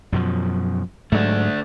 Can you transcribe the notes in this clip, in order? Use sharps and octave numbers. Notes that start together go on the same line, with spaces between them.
F#2 B2 F3
G#2 F#3 A3 D4